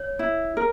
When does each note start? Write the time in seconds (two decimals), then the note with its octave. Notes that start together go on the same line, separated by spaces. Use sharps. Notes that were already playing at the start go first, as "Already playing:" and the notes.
Already playing: C#5
0.19 E4
0.57 A#4